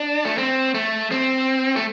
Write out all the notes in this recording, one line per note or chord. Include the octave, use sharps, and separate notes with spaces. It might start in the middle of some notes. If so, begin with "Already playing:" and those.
Already playing: D4
A3
C4
A3
C4
A3